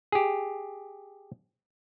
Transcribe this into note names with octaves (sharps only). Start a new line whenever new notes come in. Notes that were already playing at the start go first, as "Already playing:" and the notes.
G4 G#4